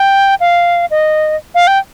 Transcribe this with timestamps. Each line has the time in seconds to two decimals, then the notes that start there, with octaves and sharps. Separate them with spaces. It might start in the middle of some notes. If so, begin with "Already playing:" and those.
Already playing: G5
0.40 F5
0.91 D#5
1.55 F5
1.67 G5